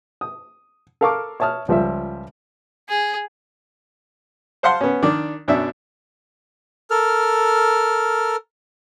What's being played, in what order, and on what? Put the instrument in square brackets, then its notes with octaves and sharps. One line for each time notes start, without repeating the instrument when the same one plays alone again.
[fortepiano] D#6
A4 A#4 F5 A5 C#6 D6
C#5 E5 A5 D#6 F6
C#2 F3 G3 E5
[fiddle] G#4
[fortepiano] C5 F5 F#5 A5 C6
B3 C#4
D#3 D4 D5
F#2 B2 D4 E5
[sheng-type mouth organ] A4 A#4 F6